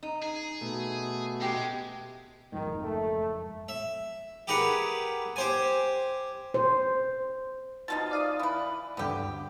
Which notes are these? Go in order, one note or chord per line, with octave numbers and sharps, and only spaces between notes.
D#4
G#4
B2 A3
G#3 G4
F#1 F2 G#2 D#3
A3
E5
G4 G#4 A#4 B4 F#5
G4 C5 G#5
C5
B2 F3 D#4 A6
D5 F5 D#6
E3 B4
D2 G2 D3 B3 G4